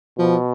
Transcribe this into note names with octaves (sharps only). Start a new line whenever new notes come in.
B2 F3